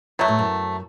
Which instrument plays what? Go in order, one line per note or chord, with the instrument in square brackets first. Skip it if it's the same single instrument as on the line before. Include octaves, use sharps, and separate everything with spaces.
[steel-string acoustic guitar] F#2 [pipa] B2 F#3 A3
[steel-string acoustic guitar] A2
F#2